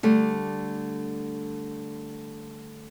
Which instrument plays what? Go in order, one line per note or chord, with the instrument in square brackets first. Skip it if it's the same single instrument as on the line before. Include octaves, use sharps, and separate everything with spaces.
[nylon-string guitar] D3 G3 A3